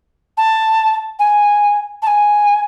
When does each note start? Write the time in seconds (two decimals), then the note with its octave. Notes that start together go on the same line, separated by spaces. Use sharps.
0.38 A5
1.19 G#5
2.02 A5
2.07 G#5